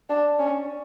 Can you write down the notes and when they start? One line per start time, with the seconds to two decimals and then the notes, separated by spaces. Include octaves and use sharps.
0.10 D4
0.39 C#4